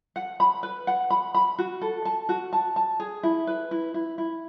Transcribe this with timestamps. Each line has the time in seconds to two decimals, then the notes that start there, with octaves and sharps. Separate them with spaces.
0.16 F#5
0.40 B5
0.63 B4
0.87 F#5
1.10 B5
1.35 B5
1.59 F#4
1.81 A4
2.05 A5
2.29 F#4
2.53 A5
2.76 A5
3.00 G#4
3.23 E4
3.47 B4
3.71 E4
3.94 E4
4.18 E4